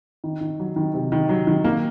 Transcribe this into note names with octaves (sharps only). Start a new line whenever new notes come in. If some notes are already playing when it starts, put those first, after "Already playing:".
D#3
D#3
F#3
D#3
C3
D#3
F#3
D#3
A#3